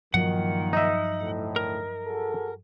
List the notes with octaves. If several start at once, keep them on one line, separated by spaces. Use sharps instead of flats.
G2 A#2 D#3 F3 F#3 F#5
D#4 D#5 E5
D2 A2
A#4
F#4 G#4 A4